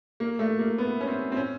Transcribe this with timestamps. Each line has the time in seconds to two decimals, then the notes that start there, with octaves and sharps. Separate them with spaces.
0.20 A#3
0.39 A3
0.59 A#3
0.78 B3
1.01 C#4
1.07 C4
1.32 C4
1.36 C#4